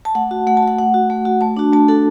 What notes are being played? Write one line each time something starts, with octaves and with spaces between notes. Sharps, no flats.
A5
A3 F#5
F#4
A3 F#5
A5
F#4
F#5
A3 F#5
F#4
A3
F#4
A3 A5
D4 F#4
A3 A5
D4 F#4 A4